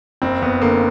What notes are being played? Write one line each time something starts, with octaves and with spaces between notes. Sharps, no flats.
F#1 C4
F#1 B3
D3 A#3